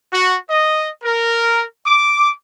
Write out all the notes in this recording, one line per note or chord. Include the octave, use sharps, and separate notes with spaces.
F#4
D#5
A#4
D6